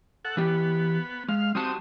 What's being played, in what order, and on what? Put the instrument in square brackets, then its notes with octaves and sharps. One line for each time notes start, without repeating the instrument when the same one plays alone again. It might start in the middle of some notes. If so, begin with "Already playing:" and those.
[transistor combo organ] A4 F#5
[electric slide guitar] E3 G4 [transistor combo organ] B3
[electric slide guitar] G#3 [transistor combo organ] F5
[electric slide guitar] G3 F#4 A5 [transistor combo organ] C4 D#6